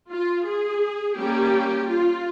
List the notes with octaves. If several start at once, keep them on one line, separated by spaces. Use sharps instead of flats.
F4
G#4
G3 A#3 C#4 G4
F4